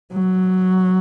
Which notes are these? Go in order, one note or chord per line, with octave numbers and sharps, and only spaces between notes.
F#3